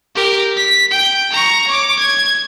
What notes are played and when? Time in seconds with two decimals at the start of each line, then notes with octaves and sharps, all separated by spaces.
0.15 G4 A#4
0.56 B6
0.91 G5
1.32 A#5 C#6
1.67 C#5 D6
1.99 G#6